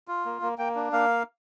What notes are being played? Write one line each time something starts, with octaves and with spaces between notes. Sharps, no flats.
F4
A#3
A#3
A#3 G5
D4
A#3 F5